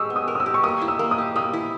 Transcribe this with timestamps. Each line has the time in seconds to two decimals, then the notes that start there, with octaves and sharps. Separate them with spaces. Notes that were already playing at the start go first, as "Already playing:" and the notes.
Already playing: G#3 G4 C#6 D#6 E6
0.10 B3
0.16 D#6
0.28 A#4
0.35 D#6
0.40 E6
0.46 G4
0.54 C#6
0.64 A#3 D#6
0.82 E4
0.88 E6
0.99 A#3
1.11 D#6
1.18 G4
1.36 A#3 D#6
1.53 E4